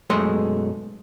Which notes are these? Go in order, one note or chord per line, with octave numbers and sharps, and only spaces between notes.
B1 F#2 G#3 A3 D#5 C6